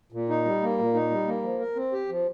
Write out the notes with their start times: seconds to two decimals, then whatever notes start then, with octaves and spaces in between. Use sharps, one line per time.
0.12 A#2
0.29 D#4
0.45 G3
0.62 A#3
0.78 A#2
0.94 D#4
1.10 G3
1.27 A#3
1.43 F3
1.60 A#4
1.76 C4
1.92 G4
2.09 F3